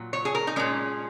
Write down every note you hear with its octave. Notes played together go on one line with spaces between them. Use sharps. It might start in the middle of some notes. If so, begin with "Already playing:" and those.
Already playing: A#2 F#3
C#5
G#4
A#4
D#4
A#2 G#3 C#4